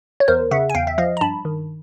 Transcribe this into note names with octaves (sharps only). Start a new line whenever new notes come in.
C#5
E2 A#4 C5
C#3 E5 F#5
G#5
E2 F5 G5
E5
F3 D#5 F5
A#5
G2 A5 B5
D#3